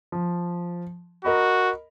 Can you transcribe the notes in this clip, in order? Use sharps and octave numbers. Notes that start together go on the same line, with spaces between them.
F3
F#4 A#4 D#5 B5